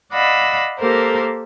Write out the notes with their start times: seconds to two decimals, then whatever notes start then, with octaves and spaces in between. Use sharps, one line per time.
0.13 D5 D#5 F5 F#5 B5 E6
0.78 A#3 G4 A4 A#4 C5